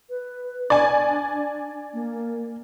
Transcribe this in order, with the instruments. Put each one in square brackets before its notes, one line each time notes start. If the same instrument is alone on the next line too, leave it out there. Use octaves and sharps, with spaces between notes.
[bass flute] B4
[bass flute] D4 [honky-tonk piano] D5 G#5
[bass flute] A#3